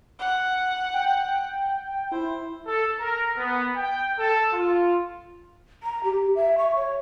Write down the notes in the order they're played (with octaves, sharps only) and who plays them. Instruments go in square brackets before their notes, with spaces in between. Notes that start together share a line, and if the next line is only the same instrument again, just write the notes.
[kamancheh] F#5
[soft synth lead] G5
[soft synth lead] E4 [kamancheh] C5
[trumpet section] A4
A#4
B3
G5
A4
F4
[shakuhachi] A#5
G4
E5
C#6
C#5